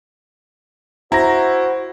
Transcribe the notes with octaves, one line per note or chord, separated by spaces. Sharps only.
E4 F#4 C5 A#5 A#6